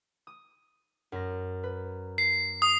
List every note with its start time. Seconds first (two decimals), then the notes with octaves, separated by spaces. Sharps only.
0.27 D#6
1.12 F#2 A#6
1.63 B4
2.18 C7
2.62 D#6